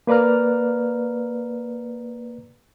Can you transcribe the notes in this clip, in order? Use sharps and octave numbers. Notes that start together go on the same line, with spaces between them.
A#3 B4 D5 A#5 F6